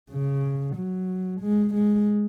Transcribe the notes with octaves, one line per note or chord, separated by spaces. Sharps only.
C#3
F#3
G#3
G#3